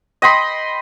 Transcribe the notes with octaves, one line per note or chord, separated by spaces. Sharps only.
D#5 G5 B5 C6